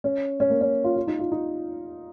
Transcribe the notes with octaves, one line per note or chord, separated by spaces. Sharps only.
C#4
C#4
A#3
C#4
F4
F4
D#4
F4
D#4